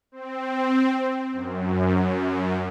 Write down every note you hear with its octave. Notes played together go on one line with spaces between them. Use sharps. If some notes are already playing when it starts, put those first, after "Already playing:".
C4
F#2